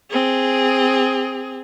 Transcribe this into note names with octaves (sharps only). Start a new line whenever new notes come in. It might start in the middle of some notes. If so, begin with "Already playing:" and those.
C4 G#4